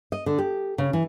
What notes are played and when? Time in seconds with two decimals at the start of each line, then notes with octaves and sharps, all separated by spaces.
0.12 D#5
0.26 D3
0.38 G4
0.78 C#3
0.93 E3